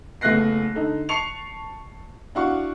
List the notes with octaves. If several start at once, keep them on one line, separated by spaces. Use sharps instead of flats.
F#1 A3 B3 F#6 A#6 C7
D3 D#4 A4
A5 C#6 C7 C#7 F7
D4 E4 F#4 F5 C#6